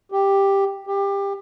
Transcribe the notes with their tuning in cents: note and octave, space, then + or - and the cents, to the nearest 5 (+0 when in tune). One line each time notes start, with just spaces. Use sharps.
G4 +5
G4 +20